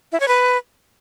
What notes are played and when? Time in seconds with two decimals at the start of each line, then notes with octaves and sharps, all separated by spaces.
0.12 E4
0.20 C#5
0.28 B4